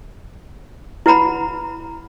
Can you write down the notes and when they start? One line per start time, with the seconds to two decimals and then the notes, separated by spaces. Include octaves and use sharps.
1.06 E4 B4 F#5 A#5 B5